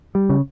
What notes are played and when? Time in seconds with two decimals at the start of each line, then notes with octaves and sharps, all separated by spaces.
0.15 G3
0.29 C#3